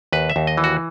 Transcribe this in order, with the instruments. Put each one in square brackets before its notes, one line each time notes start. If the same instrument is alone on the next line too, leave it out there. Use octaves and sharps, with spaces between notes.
[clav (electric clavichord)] D#2 B4
E5
D#2
D#5
E3
F#4